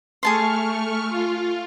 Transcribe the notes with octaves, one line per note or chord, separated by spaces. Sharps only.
A3 G#4 A5 C6 C#6 F6
F4